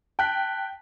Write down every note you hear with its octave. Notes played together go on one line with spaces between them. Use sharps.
G5 A5 F#6 B6